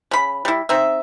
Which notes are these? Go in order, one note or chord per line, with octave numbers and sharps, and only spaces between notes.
C#3 B5
G3 E4
C4 D#4 E5